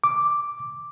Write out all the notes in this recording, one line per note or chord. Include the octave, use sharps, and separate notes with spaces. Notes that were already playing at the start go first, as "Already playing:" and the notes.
D6